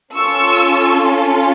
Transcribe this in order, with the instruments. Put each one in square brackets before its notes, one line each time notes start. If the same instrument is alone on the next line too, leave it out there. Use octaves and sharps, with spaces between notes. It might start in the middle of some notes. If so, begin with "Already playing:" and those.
[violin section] C#4 F4 A4 C#6 E6